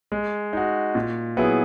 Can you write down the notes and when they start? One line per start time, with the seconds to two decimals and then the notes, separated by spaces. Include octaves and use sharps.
0.12 G#3
0.53 D#4 F#4
0.95 A#2
1.37 F#3 B3 E4 G#4